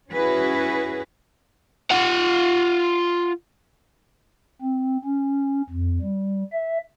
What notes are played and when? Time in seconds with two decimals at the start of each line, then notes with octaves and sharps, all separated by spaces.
0.10 C#4 E4 F#4 G#4 B4
1.91 F4 F#5
4.62 C4
5.05 C#4
5.70 F2
6.01 G3
6.52 E5